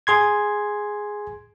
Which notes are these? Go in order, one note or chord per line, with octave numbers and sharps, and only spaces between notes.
G#4 C6 G#6